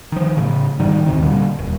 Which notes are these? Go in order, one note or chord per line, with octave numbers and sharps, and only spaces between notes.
D#3 F3
A2 C#3
G#2 D#3 G3
D#2 C3 D#3
A#2 D3 G3
D#1